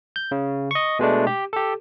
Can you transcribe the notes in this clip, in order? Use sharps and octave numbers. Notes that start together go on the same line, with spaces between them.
G6
C#3
D#5 C#6
B2 G#3 A3 D4
G4
G4 A4